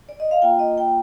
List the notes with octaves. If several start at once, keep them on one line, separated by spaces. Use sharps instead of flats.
D5
D#5
F5
A#3 F4 G5
D#5
G5